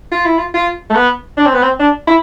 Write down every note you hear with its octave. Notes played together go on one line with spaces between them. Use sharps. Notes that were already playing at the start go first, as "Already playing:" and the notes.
F4
E4
F4
F4
A3
B3
D4
C4
B3
C4
D4
E4